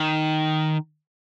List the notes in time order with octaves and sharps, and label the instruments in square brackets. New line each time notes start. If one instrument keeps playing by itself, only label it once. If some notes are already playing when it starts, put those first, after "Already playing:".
Already playing: [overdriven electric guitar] D#3